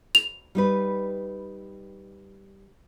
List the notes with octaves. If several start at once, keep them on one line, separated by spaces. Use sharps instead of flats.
F7
G3 D#4 B4